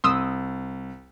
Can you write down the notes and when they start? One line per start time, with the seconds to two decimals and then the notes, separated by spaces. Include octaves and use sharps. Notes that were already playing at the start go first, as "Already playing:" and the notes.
0.04 C2 C6 D#6 E6